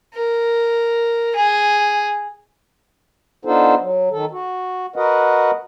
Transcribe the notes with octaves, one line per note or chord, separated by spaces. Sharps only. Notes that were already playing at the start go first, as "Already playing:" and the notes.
A#4
G#4
B3 D4 D#4 F4 A4 C5
F#3
D#3 A4
F#4
F#4 A#4 B4 D#5 F#5